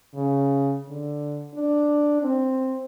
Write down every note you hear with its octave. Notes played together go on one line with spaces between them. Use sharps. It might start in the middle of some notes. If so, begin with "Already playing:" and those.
C#3
D3
D4
C4